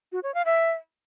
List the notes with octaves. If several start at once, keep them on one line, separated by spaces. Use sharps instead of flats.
F#4
C#5
F5
E5